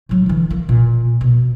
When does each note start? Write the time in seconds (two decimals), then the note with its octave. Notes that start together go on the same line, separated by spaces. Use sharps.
0.09 A2 F#3
0.26 D3 E3
0.50 A#3
0.69 A#2
1.21 B2